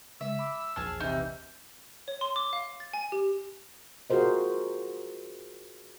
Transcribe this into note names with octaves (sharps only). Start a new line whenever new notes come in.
C#3 G#3 E5 E6
B5 D6
A#1 E2 G#4 A5 F6
C3 E3 D#4 E6
C#5
C6
D6
F5
A6
G#5
G4
F4 F#4 G#4 A#4 C5 D#5